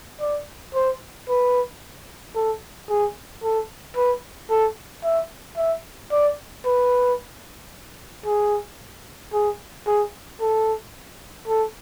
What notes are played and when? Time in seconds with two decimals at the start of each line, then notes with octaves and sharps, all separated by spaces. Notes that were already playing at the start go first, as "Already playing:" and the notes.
0.21 D5
0.74 C5
1.29 B4
2.35 A4
2.90 G#4
3.43 A4
3.96 B4
4.50 A4
5.04 E5
5.57 E5
6.11 D5
6.65 B4
8.26 G#4
9.33 G#4
9.87 G#4
10.41 A4
11.48 A4